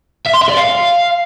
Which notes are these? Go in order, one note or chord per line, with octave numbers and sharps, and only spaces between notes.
E5
C6
E5
D5
F5